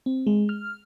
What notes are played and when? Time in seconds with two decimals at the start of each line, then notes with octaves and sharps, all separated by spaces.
0.06 C4
0.27 G#3
0.49 F6